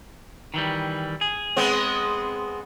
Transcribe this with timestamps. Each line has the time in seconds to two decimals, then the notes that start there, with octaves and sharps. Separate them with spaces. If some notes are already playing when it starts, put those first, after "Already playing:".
0.54 D#3 E3 G3
1.21 G#4
1.56 G#3 B3 C4